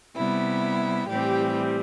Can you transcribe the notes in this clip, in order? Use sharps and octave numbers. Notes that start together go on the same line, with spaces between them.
C3 G3 B3 E4
A2 E3 G3 C4 G4